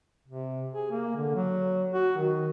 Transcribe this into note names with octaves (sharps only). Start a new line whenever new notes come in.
C3
G#4
A#3
D3
F#3
F#4
D#3